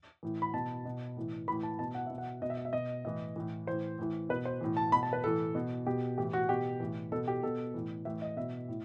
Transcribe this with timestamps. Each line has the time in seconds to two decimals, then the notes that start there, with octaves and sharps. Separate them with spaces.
0.23 A2 E3
0.42 B5
0.54 B2 A5
0.85 B2
1.16 A2 E3
1.48 E3 B5
1.51 A2
1.63 A5
1.79 B2 A5
1.95 F#5
2.06 B2 E5
2.18 F#5
2.42 B2 D#5
2.50 E5
2.57 D#5
2.65 E5
2.73 B2 D#5
3.05 A2 E3 D#5
3.36 A2 E3
3.67 A2 E3 C5
3.99 A2 E3
4.29 B2 B4
4.45 C5
4.61 A2 E3
4.77 A5
4.92 B2 B5
5.03 A5
5.13 B4
5.24 A2 E3 A4
5.55 B2
5.86 B2 G4
6.18 A2 E3 G4
6.33 F#4
6.49 B2 G4
6.80 A2 E3
7.12 B2 A4
7.28 G4
7.43 B2 A4
7.74 A2 E3
8.05 A2 E3 E5
8.22 D#5
8.37 B2 E5
8.68 A2